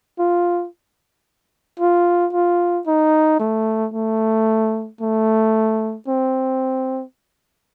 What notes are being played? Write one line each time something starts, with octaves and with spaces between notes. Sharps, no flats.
F4
F4
F4
D#4
A3
A3
A3
C4